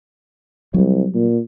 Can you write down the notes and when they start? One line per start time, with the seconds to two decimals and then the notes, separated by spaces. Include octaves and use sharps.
0.74 C2 F#3 G3
1.14 A#2